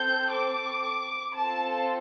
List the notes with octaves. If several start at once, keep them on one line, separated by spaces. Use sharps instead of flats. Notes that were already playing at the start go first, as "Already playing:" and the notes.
Already playing: C4 A4 G6
D6
C4 F4 A4 A5